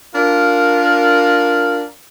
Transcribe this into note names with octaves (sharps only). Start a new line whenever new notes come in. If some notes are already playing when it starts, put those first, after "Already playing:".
D4 F4 A#4